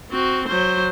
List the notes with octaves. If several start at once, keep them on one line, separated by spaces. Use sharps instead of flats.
C4 F#4
F#3 C5